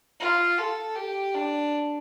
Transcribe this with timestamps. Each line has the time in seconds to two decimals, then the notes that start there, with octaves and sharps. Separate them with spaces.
0.20 F4
0.58 A4
0.96 G4
1.34 D4